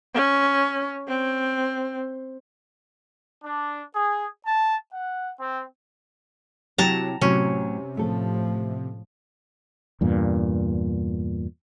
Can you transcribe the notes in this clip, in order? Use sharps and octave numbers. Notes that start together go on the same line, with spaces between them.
C#4
C4
D4
G#4
A5
F#5
C4
C3 F#3 E4 G4 A5 A#5
A2 C3 F#3 C#4
A2 F3 A3 A4
E2 G2 A#2